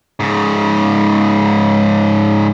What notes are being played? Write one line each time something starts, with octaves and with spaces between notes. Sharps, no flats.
G#2 C#3